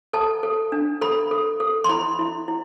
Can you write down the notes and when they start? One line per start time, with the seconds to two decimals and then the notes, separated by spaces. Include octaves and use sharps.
0.13 A4 A5
0.43 A4
0.72 D4
1.01 A4 B5
1.31 A4
1.60 A4
1.84 C6
1.89 E4 B5
2.19 E4
2.48 E4